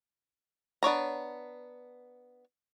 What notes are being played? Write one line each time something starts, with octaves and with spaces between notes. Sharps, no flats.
B3 D4 C#5 A#5